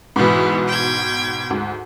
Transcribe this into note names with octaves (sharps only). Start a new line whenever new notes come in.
G#2 B2 E3 B3
G5 G#6
D2 G#2